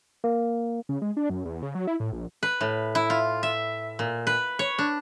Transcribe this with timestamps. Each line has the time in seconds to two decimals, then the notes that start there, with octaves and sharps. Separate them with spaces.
0.24 A#3
0.89 C#3
1.02 G#3
1.17 D4
1.30 F#2
1.45 E2
1.62 C#3
1.75 F#3
1.87 E4
2.00 A2
2.12 A#1
2.43 B4
2.61 A2
2.95 E4
3.10 F4
3.43 E5
3.99 A#2
4.27 B4
4.59 C#5
4.79 D4